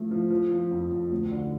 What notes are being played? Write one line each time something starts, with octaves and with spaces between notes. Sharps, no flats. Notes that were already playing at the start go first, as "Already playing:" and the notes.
Already playing: F3 A3
F3
F3
F3
F2
F2
D2
D3